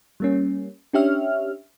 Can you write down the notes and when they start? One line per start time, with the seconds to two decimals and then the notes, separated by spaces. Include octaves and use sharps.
0.20 G3 A#3 C#4
0.93 C#4 D4 G4 C#5 E5 F6